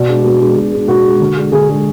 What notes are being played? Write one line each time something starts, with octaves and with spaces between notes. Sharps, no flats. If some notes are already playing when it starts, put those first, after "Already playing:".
Already playing: B2 D5
G#3 D4
B2
G#3 D4
B2
G#3 D4
B2 F#4
G#3 D4
D3
G#3 D4
D3 G#4
G#3 D4